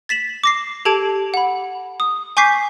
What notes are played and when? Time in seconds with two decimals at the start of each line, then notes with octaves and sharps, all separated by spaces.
0.09 A6 B6 E7 F#7
0.44 D6 A#6 C7
0.85 G4 A4 A5 G#6 D7
1.34 F#5 B5
2.00 D#6
2.37 G#5 C#6 D6 G6 B6 C7